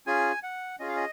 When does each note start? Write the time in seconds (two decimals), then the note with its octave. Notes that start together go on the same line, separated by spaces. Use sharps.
0.07 C#4 F4 G#4 G#5
0.43 F#5
0.80 C#4 F4 G#4 D#5
0.88 F5
0.96 D#5